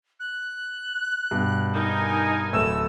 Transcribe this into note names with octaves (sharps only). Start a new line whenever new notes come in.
F#6
G2 B2
D#4 A#4 G#5 G6
D1 A3 B4 E6